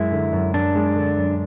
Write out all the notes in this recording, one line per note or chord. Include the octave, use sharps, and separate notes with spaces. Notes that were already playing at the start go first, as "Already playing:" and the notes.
Already playing: F#2 G#3 E4
D3
F#2
F#2 D4
G#3
D3
F#2